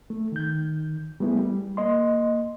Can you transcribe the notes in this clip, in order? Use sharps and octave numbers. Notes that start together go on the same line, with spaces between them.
A3
D#3 G6
G3 A3 B3 E4 G#4
G3
A#3 D#5 C6